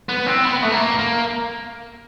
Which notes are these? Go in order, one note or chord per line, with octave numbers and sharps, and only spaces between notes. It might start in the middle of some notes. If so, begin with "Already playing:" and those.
B3
C4
B3
A3
A#3
A#3